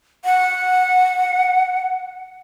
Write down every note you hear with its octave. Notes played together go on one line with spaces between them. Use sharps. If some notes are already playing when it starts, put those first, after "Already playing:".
F#5